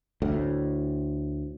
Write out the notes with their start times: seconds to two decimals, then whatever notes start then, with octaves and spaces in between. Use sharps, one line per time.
0.22 D2 A2